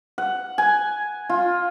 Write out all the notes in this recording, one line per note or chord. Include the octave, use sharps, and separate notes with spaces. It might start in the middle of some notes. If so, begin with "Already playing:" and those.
F#5
G#5
F4